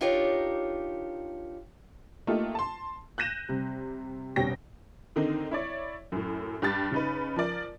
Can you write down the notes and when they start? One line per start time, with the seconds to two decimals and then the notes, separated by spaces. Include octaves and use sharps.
0.01 D4 D#4 F4 G4 A#4 C#5
2.27 A3 A#3 D#4 F4 G4
2.55 A5 C6
3.18 F#6 G6 A#6 D#7 E7
3.49 C3 G3
4.36 F1 B2 G3 C#4 G5 A#6
5.16 D3 D#3 C4 D#4
5.51 E4 C#5 D5
6.12 F#2 A2
6.62 G2 G4 A6
6.92 C#3 D#4 B4
7.36 F3 A#4 D5